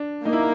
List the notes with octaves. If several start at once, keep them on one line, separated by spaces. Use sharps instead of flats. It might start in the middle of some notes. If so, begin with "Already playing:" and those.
Already playing: D4
A#3 D#4
E4